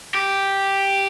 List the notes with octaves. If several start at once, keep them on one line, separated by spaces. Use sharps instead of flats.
G4